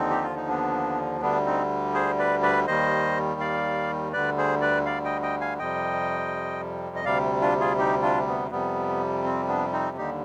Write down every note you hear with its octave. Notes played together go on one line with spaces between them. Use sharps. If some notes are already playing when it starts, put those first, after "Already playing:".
Already playing: D#2 D3 F3 C4 D#4
G4
F4
D#4
B3 D4
D2 D3 G3 B3 D4
C4 D#4
G#4 C5
B4 D5
B4 D5
D#2 D#3 G3 C5 D#5
D5 F5
D2 D3 G3 B4 D5
G#4 C5
B4 D5
D5 F5
D#5 G5
D#5 G5
F5 G#5
F2 C3 G3 D#5 G5
D#5
D2 C3 G3 D5 F5
D4 F4
F4 G#4
D#4 G4
D4 F4
B3
F2 C3 G3 B3
C4
B3 D4
C4 D#4
D#2 D3 G3 D#4 G4